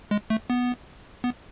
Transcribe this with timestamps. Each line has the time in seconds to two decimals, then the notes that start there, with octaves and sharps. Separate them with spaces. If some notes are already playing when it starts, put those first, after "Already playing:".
0.11 G#3
0.30 A3
0.50 B3
1.24 B3